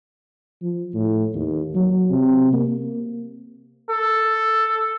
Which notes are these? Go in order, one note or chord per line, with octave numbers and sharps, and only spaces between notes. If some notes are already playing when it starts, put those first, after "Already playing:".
F3
A2
D#2
F#3
C3
A#3
A4